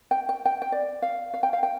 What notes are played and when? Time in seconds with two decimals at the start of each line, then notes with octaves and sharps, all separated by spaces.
0.11 G5
0.29 G5
0.45 G5
0.62 G5
0.72 D5
1.02 F5
1.34 F5
1.43 G5
1.53 F5
1.63 G5